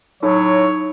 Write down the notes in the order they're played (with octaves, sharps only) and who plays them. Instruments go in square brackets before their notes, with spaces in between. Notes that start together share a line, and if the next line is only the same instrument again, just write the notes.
[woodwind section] A2 F#3 [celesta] D#4 [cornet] C#5